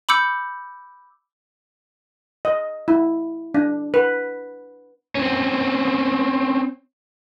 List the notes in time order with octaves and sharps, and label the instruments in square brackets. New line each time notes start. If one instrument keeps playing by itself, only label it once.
[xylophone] B5 D6 E6 G6 C#7
[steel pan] D#5
E4
D4
B4
[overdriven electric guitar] C4 C#4